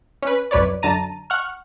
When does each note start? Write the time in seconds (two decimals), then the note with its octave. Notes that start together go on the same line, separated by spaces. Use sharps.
0.23 C#4 B4
0.51 C2 F#2 B4 C#5 D5
0.82 F#2 D3 A5 A#5 D#7
1.30 F#5 C#6 F6